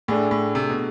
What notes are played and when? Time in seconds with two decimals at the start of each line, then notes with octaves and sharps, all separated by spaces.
0.08 A2 A3 D4 G#4
0.31 A2
0.55 C3
0.70 B2